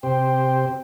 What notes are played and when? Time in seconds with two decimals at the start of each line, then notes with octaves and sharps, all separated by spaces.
0.03 C3 G4 C5 G5